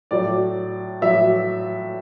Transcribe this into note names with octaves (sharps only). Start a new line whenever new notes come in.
A2 F#3 D5
A2 F#3 E5